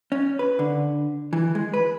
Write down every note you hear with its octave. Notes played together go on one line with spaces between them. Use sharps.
C#4
B4
D3
E3
G#3
B4